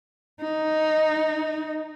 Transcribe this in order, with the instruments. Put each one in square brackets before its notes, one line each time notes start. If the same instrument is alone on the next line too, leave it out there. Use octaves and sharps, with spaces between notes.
[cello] D#4